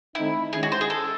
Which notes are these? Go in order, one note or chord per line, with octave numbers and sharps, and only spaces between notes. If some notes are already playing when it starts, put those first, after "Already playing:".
D#3 A3 C4 D#4 E4
D#3 G#3 C#4 E4 G#4
F#4
C5
G#4
A4